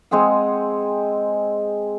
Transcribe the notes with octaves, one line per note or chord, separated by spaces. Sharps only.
G#3 C4 G#4 F#5